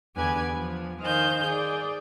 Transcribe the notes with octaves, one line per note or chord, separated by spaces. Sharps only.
E2 D3 G4 B4 G#5 G#6
F3
D#3 C5 D#5 F5 G#5 G6
G#4 D5